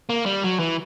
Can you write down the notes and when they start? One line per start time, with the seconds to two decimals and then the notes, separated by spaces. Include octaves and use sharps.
0.09 A#3
0.26 G3
0.44 F#3
0.59 E3